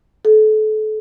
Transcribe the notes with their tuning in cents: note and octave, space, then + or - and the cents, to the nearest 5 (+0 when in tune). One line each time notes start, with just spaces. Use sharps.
A4 -35